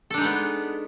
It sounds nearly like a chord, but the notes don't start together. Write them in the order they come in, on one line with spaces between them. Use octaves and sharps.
A4 D4 D#4 G#3 B3